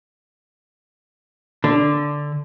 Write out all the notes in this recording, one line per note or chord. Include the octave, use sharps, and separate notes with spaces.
D3